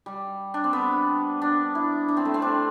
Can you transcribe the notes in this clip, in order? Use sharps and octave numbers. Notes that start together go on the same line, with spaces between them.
G3
D4
C4
B3
D4
E4
D4
C4
A3
C4
D4